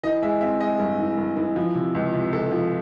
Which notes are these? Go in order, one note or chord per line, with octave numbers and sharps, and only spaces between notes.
E3 D#5
G#3 E5
C4 E5
G#3 D#5
G2
E3
G2
E3
F3
C3
C#2
C3
C#2 A4
F3